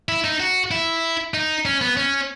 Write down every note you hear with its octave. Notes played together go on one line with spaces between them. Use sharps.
E4
D#4
F#4
E4
D#4
C#4
B3
C#4